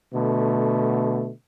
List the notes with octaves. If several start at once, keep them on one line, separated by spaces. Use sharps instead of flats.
B2 D3 A3